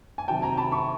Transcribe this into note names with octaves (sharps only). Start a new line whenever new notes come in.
G#5
C3 D#3 F#3 G5 A5
G#5 A#5
A5 B5
B5 C#6